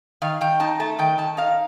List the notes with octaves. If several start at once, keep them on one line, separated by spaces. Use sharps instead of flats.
D#3 F5
D#3 G5
D#4 A5
A3 A5
D#3 G5
D#3 A5
D#4 F5